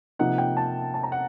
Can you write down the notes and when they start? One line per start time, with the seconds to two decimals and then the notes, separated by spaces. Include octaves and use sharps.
0.19 C3 F3 A#3 D#4 F#5
0.38 G5
0.57 A5
0.94 A5
1.03 A#5
1.12 F#5